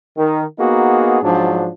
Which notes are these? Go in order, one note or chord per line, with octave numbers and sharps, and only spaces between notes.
D#3
A#3 B3 D#4 F#4 G#4
G#2 F3 F#3 D4